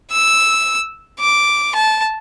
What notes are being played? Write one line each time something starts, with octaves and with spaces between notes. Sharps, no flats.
E6
D6
A5